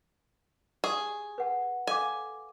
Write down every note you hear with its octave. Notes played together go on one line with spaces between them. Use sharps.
G4 G#4
B4 F#5 A5
A4 F5 G#5 D6